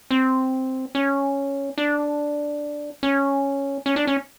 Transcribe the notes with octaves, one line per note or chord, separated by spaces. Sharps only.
C4
C#4
D4
C#4
C#4
D4
C#4